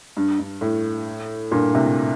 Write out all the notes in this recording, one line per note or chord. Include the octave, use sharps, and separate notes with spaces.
G2
G2
A2
G2 A#2
A2 C3